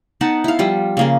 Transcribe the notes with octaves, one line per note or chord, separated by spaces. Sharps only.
B3 D#4 F#5 A5
E4 F5
F3 G3
C#3 A#3 G#4